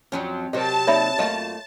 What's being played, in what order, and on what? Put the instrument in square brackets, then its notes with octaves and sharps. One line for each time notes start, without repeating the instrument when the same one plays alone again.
[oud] F2 F3 F#3 [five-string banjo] C#4
[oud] C3 F#3 [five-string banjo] A#4 C5 D#5 [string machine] A5
[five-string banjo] A#3 D#4 D5 [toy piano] C#5 E5 B5
[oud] F#2 F4 [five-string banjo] A3 A#3 D#5